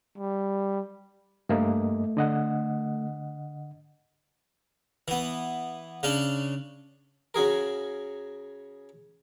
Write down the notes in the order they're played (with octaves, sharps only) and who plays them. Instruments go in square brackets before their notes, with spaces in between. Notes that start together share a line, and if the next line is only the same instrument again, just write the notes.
[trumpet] G3
[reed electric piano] G2 A#3 D#5 [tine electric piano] A3
[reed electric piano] D3 D#5 F#5
[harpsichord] E3 B3
C#3 C#4 D4
C#3 F#4 G#4 A#4